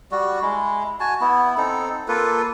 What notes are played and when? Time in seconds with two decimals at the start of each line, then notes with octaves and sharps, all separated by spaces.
0.12 G3 F#4
0.42 G#3 E4
1.00 F#4 G#5 A5
1.21 B3 E4
1.58 C4 D#4 A4
2.08 A#3 F4 A4 B4